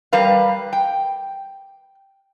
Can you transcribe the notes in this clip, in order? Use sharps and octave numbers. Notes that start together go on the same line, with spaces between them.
G3 A#4 B4 F5
G5